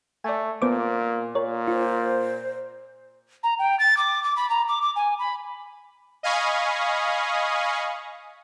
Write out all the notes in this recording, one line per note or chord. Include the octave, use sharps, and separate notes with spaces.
A3 D5 G#5
A#2 B3 C5 D6
A#2 A#4 C#5
F4 C5
A#5
G5
A6
D6
D6
B5
A#5
D6
D6
G#5
B5
D#5 F5 G#5 B5 C#6 D#6